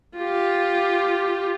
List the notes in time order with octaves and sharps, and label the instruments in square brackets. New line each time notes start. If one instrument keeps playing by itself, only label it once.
[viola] F4 G4